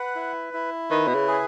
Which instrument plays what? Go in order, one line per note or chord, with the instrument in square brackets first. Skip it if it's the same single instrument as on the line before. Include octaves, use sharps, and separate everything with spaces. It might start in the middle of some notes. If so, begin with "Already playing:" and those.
Already playing: [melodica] B4 F#5
E4
E4
[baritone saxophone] D#3 [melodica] B4
[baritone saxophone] B2
C#3
[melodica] G#4